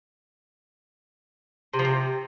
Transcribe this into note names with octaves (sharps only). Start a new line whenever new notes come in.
C3
F3
C3